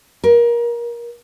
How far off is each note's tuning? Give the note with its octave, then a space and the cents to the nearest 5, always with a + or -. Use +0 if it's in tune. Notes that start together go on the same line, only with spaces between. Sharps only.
A#4 +25